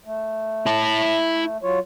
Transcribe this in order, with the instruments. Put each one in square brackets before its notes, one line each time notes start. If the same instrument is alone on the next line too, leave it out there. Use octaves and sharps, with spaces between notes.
[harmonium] A3
[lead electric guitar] E4 A5
[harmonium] F#3 F4 C#5